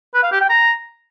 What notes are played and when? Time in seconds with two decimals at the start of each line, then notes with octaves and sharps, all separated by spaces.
0.14 B4
0.23 F5
0.32 G4
0.41 G5
0.50 A#5